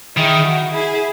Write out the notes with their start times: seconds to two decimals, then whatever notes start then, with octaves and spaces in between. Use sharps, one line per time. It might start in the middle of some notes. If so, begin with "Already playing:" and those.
0.17 D#3 E4 G#4
0.45 F#4
0.73 E4 G#4